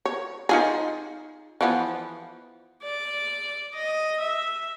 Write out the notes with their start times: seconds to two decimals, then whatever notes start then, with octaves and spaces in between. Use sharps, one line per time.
0.05 C#5
0.49 D#4 F4 G#4
1.61 E3 F3 B3
2.83 D5
3.74 D#5
4.20 E5